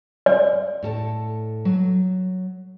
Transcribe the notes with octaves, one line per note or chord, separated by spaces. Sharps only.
D5
A2 A4 A5
F#3